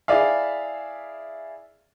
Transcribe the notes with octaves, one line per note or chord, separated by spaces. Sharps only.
E4 G#4 D5 E5 F5